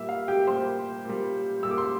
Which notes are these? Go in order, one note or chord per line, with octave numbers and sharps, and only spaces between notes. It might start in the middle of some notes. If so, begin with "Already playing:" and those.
Already playing: A#2 G3 E5
F5
G4 G5
A#2 G3 C5 C6
A#2 G3
A#2 G3 E6
D6
C6